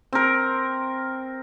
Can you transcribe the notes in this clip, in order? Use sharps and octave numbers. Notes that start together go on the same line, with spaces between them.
C4 A#4